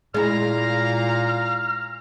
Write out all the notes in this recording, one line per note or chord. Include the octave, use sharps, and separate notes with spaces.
A#2 G#3 E4 F5 A#5 F6